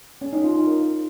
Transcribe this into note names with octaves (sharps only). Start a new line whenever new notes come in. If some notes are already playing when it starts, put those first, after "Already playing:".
C#4
D#4
F4
D#4
A#4